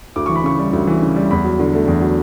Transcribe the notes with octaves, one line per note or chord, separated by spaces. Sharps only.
D2 D6
E3 C#6
B5
C#3 C#6
G3
D2
E3
C#3
G3
E2 B5
F#3
D3
A3
E2
F#3